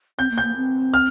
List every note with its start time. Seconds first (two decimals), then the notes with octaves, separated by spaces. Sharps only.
0.19 C4 G6
0.31 A#3
0.38 G6
0.44 A#3
0.56 C4
0.94 F6